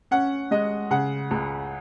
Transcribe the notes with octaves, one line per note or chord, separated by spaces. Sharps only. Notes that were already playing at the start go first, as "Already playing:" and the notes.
C#4 F#5
G#3 D#5
C#3 F#5
C#2